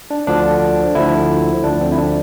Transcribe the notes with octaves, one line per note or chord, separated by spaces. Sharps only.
D4
D2 D3 F3 D4
D2 D3 F3 E4
D2 D3 F3 D4
C4
E4
D4